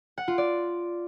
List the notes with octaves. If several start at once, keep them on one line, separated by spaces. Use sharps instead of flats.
F#5
F4
D5